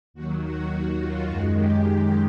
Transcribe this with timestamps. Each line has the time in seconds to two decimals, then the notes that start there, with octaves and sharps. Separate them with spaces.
0.14 D#2 D#3 F#3 F#4
0.42 F#4
0.99 F4
1.28 F#2 D#3 G#3 F#4
1.56 G4